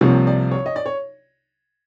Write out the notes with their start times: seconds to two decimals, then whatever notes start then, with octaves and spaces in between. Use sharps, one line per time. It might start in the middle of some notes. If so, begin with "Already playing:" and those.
0.01 C2 C3 F3 A#3 C#5
0.27 D5
0.51 C#5
0.66 D#5
0.76 D5
0.86 C#5